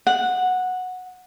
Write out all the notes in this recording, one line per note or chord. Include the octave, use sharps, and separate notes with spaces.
F#5